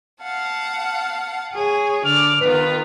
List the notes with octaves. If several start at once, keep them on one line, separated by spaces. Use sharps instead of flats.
F5 F#5 A5
G#4 C#5
D3 D5 F6
D#3 B3 F4 B4